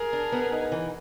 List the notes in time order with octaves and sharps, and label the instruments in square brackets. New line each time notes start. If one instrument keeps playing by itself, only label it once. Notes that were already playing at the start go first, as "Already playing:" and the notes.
Already playing: [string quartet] G#4 A#4
[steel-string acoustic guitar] D4
B3
D#4
E3